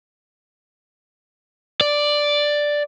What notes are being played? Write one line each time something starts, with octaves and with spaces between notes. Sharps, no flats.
D5